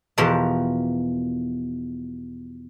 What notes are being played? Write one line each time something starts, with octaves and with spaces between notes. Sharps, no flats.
E2 B2 F3 G4 A#4 A5